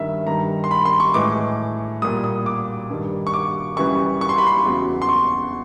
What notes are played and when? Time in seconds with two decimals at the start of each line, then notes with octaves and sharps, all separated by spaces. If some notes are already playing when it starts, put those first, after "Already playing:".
Already playing: G2 D#3 G3 E5
0.27 G2 D#3 G3 A#5
0.64 C6
0.71 B5
0.85 C6
1.00 C#6
1.14 A2 E3 G#3 D6
2.02 A#2 G3 D#6
2.24 D#6
2.46 D6
2.90 G2 D#3 G3
3.27 C#6
3.34 D6
3.77 F#2 C#3 E3 G3 C#6
4.21 C#6
4.29 C6
4.38 B5
4.47 C6
4.65 E2 C#3 F#3
5.02 C6
5.09 C#6